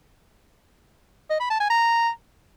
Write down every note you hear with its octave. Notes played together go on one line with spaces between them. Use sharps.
D#5
B5
A5
G#5
A#5